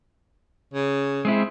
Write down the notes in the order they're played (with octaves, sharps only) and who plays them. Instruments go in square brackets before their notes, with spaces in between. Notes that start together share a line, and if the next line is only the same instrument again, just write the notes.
[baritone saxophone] C#3
[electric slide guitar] G#3 C4 E4